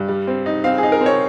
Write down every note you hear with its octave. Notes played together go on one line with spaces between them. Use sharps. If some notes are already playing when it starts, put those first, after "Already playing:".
Already playing: G2
G3
C4
D#4
C4 F5
G#4
D#4
A#4
C4
C#5